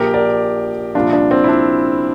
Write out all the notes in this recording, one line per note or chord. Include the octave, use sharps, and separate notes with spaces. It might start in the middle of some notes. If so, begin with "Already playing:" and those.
Already playing: A#1 A#2 F3 G4 A#4
A#4 D5
C2 A#2 F3 D4 F4
D4
C4
E4
D4